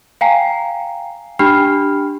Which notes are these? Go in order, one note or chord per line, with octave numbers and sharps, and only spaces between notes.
F5 G5 G#5 A#5 C7
D4 G4 G5 B5 F6 C7